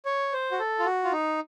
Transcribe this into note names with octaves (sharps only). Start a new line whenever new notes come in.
C#5
C5
F#4
A4
F4
F#4
F4
D#4